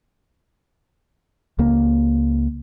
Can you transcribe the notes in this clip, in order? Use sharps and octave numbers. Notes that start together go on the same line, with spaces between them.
C#2 C#3 A#3